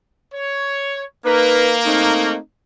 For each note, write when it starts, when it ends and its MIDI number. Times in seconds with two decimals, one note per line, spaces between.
0.33 1.03 73
1.26 2.36 58
1.26 1.75 63
1.26 1.75 70
1.26 1.75 71
1.86 2.36 57
1.86 2.36 60
1.86 2.36 63